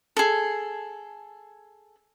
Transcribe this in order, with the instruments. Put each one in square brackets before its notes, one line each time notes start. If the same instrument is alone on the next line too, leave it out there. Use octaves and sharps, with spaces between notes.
[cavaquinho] G#4 A4